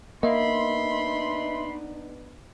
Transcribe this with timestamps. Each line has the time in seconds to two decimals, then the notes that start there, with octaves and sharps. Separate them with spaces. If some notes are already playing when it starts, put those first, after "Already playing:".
0.23 A#3 B3 D4 D#4 D#5 E5 B5 C6